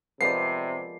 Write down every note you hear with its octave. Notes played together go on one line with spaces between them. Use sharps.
C3 F3 G#3 B3 A#4 D5 C7